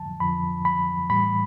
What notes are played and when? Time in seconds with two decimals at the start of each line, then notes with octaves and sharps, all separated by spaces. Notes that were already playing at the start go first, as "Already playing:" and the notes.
Already playing: F2 D3 F3 A5
0.20 F2 D3 F3 B5
0.65 B5
1.10 A2 E3 G3 B5